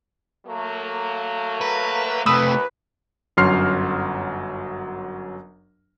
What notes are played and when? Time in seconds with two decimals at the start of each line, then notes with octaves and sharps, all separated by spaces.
0.46 F#3 A3 A#3
1.61 B4
2.26 D#2 C3 A3 B4 D#6 E6 E7
3.37 G1 F#2 F#3 C6 F6 C7